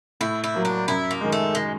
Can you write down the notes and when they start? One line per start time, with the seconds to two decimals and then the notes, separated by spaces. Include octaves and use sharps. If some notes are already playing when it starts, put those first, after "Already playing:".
0.21 A2 E4
0.44 E4
0.54 F#3 A#3
0.65 D4
0.88 F#2 E4
1.11 A#3
1.21 D#3 G#3
1.32 A3
1.55 G#3